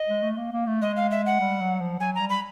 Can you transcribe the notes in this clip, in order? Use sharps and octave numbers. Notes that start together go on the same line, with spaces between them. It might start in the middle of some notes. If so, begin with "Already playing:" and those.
Already playing: D#5
G#3
A3
A#3
A#3
A3
G#3 D#5
F5
E5
F#5
G3
F#3
F3
F#3 G#5
A#5
G3
B5